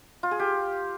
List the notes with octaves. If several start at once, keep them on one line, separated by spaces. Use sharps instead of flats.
F4
G#4
G4